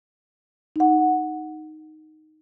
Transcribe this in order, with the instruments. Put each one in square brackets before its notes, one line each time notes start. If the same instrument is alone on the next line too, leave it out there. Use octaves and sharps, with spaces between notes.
[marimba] D#4 F#5